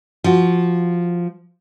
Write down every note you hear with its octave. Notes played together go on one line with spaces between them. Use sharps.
F3 F#4